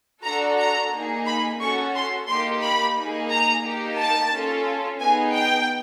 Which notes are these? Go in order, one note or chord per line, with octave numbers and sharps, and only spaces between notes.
D4 F#4 A4 A#5
A#5
A#3 D#4 G#4
B5
C#4 F#4 A4 C#6
C6
A#3 D#4 G4 C6
B5
A#3 D#4 G#4
A#5
A#3 D#4 G4
A5
C#4 F4 A4
B3 D#4 G#4 G#5
G5